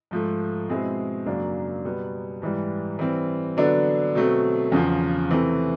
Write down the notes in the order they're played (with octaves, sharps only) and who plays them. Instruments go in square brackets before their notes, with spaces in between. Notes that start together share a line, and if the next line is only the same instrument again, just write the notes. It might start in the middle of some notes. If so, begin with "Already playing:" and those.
[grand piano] G#2 F3 A3
B2 G#3 C4 E4 G#4
F#2 C#3 F#3 A#3 D4
B2 G3 B3
G#2 E3 G3
E3 G3 C4
D3 F#3 B3 D4
B2 F#3 A3 C4
E2 C#3 F3
C3 E3 A3 C4